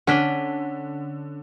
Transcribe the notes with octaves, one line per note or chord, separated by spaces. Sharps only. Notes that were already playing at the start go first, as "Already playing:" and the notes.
D3 C#4 D4 F#5 B6 G7